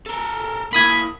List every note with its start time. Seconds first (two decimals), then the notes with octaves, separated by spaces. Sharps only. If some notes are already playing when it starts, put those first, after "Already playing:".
0.07 A4 A#4
0.73 A#3 E4 B5 D#6 G#6